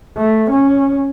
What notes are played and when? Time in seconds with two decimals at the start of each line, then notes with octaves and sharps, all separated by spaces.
0.17 A3
0.51 C#4